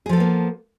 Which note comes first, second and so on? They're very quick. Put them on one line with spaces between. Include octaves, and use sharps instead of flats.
G#4 F3 A4 B3 A#3